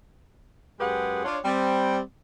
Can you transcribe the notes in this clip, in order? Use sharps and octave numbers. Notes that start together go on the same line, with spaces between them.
F#2 G#3 G4 G#4 B4 F#5
D4 F4 C#5
G3 C4